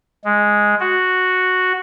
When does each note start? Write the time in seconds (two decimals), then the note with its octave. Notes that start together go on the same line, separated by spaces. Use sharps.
0.24 G#3
0.80 F#4